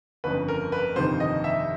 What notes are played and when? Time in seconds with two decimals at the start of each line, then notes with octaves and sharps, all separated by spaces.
0.24 G1 F2 C#3 B4
0.48 A#4
0.72 B4
0.96 G1 F2 C3 D#3 C5
1.20 D#5
1.44 E5